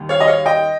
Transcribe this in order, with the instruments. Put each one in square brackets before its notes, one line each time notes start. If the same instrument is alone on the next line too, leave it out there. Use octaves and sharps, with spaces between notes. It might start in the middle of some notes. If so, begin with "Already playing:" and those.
Already playing: [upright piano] D#2 D#3 G3
C#5 F5
D#5
C#5 F5
D#5 G5